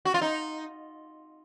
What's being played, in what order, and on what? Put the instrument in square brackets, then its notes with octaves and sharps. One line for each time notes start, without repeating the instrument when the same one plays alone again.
[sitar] F#4
F4
D#4